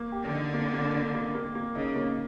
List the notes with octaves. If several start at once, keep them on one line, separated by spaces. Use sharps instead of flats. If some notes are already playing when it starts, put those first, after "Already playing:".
Already playing: A#3
G4
D3
D#4
A#3
A#3
A#3
A#3
A#3
A#3
C#3 D#4
A#3